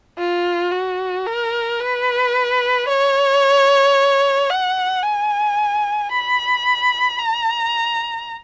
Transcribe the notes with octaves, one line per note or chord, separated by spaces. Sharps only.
F4
F#4
A#4
B4
C#5
F#5
G#5
B5
A#5